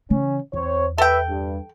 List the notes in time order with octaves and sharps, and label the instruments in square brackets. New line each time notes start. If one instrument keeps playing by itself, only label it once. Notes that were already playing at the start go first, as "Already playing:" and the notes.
[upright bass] C#3 E3 [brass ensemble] C#4
[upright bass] E2 [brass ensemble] C4 C5 C#5
[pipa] A4 G5 [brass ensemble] B4 E5
[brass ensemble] G2